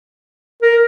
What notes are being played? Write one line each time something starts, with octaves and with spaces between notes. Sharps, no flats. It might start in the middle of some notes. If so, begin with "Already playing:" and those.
A#4